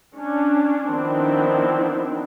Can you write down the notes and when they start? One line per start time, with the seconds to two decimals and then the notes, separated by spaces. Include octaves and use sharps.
0.15 C#4 D4
0.89 D#3 F3 B3 C4 D4 E4